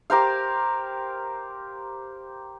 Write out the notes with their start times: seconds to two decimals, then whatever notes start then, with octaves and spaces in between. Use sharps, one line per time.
0.10 G4 A#4 C5 F5